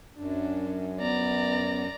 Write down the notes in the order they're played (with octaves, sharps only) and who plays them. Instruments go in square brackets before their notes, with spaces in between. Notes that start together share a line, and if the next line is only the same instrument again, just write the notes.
[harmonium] F#2 [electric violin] D4
[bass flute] B3 [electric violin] D5 A#5